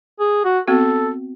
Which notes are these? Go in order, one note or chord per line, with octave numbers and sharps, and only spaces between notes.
G#4
F#4
B3 C4 F#4 A4